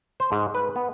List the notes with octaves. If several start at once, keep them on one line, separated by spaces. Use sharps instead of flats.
C5
G#2
B4
B3